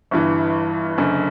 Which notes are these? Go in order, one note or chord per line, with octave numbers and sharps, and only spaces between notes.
G1 G2 E3
F#1 F#2 D3